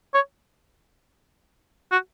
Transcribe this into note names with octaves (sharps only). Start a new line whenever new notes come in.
C#5
F#4